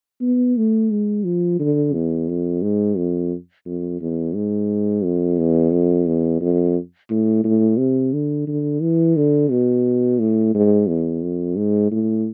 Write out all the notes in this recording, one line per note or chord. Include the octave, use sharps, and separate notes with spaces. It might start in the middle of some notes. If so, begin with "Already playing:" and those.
B3
A3
G#3
F3
D3
E2
F2
G#2
F2
F2
E2
G#2
F2
E2
F2
E2
F2
A2
A2
C3
D3
D3
E3
D3
B2
A2
G#2
E2
F2
G#2
A2